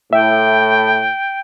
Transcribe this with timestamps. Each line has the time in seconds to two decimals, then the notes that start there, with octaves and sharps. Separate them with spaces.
0.13 A2 E5 G5